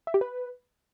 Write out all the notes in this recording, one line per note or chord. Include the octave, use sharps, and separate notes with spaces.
E5
G4
B4